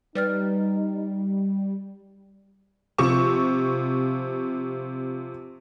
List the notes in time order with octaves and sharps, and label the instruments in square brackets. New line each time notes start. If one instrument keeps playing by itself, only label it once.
[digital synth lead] G3 [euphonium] D#4 [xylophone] B4 D5 F6
[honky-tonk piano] C3 F3 C#6 E7